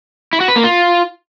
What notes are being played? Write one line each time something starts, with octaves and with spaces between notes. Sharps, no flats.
E4
F#4
B4
A#3
F4